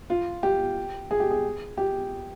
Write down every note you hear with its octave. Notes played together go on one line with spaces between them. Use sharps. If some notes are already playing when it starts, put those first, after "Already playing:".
F4
G4
G#4
G4
G#4
G4